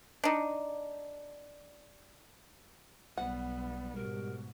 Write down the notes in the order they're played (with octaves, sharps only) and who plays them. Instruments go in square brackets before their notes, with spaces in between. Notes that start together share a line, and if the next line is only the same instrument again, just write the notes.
[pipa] D4 D#4
[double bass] B1 B3 [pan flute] G3 [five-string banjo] F#5
[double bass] G#2 B2 [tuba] G3 [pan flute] A#4